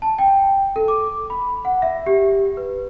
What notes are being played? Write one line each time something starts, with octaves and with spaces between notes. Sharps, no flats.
A5
G5
A4
D6
B5
F#5
E5
G4
B4